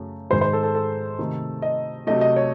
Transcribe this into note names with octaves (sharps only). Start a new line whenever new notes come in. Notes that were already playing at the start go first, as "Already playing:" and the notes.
Already playing: F#2 C#3 A3
G#2 D#3 G#3 C5
C5
A4
A4
A4
C3 D#3 A3
D#5
C3 F#3 A3 D#5
D#5
C#5